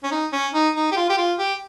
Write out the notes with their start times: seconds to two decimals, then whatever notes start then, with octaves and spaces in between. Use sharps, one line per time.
0.04 C#4
0.11 D#4
0.33 C#4
0.54 D#4
0.75 D#4
0.92 G4
0.97 F4
1.10 G4
1.18 F4
1.39 G4